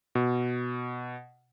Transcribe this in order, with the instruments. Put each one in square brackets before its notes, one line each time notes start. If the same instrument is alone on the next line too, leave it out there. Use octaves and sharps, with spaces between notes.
[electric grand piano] B2